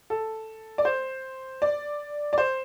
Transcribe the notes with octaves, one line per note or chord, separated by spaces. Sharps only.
A4
D5
C5
D5
D5
C5